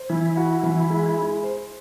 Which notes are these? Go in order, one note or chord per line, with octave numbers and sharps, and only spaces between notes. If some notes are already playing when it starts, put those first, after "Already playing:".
Already playing: C5
E3 E4
F#4
E3
G#3
G#3
C5